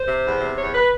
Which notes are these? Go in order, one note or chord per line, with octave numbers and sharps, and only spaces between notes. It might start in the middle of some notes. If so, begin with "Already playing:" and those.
Already playing: C5
C3
E2
C3
E2 C#5
B4